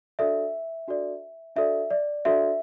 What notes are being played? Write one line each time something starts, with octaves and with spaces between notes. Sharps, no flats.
D4 F#4 A4 D5 E5
D4 F#4 A4 D5
D4 F#4 A4 D5 E5
D5
D4 F#4 A4 D5 E5